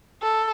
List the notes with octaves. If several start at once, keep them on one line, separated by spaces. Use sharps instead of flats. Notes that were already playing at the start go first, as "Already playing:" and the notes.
A4